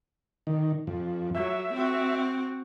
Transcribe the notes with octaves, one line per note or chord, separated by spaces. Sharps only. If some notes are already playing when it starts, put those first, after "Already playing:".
D#3
F2
F#3 E5
C4 F#4